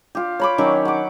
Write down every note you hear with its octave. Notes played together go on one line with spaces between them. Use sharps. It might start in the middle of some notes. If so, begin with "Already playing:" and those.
F4 G4
C#5 B5 D6
D#3 F#3 C#4 G4
F#5 D6